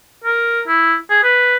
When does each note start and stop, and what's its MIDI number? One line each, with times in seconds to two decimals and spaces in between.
0.25 0.61 70
0.68 0.95 64
1.10 1.22 68
1.23 1.57 71